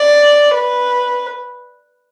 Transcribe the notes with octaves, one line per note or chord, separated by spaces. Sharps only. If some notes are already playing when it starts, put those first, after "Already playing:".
Already playing: D5
B4